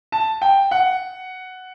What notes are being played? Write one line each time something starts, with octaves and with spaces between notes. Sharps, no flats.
A5
G5
F#5